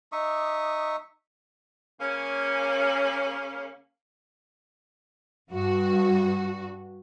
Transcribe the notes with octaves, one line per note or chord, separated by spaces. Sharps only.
D#4 E5 C#6 D#6
C#3 A#3 C#4
G2 F#4